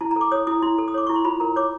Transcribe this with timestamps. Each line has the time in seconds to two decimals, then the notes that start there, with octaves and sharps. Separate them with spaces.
0.01 E4 A5
0.11 A#5
0.16 A4 D6
0.32 C#5 D#6
0.47 E4 D#6
0.62 E4 C6
0.78 A4
0.88 D#6
0.94 C#5 D6
1.07 E4 C#6
1.16 C6
1.25 F4 B5
1.40 A#4 A#5
1.56 C#5 D6